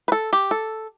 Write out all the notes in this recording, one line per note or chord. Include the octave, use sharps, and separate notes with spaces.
B4
A4
G4
A4